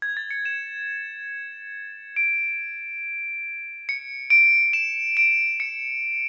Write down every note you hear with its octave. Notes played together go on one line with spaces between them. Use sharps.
G#6
A6
C#7
E7
D7
C#7
D7
E7
D7
C#7